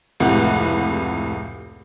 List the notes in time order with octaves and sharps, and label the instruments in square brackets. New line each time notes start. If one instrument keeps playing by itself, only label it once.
[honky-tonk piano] F1 C#2 A2 C3 F#5